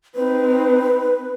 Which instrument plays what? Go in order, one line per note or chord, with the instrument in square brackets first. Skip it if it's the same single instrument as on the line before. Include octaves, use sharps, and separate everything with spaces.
[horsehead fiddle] C4 D#4 [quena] B4